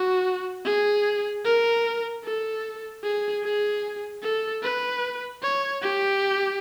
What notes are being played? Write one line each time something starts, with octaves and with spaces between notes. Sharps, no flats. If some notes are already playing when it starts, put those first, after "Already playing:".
Already playing: F#4
G#4
A#4
A4
G#4
G#4
A4
B4
C#5
G4